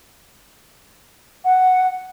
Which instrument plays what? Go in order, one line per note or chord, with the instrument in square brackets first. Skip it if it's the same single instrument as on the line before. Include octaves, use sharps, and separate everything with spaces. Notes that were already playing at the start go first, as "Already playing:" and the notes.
[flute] F#5